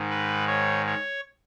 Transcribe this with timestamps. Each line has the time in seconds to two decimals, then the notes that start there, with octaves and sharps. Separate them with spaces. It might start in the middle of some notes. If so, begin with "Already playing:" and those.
Already playing: G#2 D#3
0.10 B4
0.47 C#5
0.87 C#5